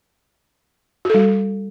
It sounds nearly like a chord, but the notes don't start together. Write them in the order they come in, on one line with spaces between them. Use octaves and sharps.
F#4 A4 G3